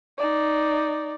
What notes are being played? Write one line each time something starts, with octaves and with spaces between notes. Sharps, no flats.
D#4 D5